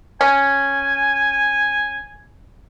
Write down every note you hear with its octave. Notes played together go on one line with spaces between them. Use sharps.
C#4 G#5